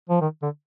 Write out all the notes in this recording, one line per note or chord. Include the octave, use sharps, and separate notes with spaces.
F3
D#3
D3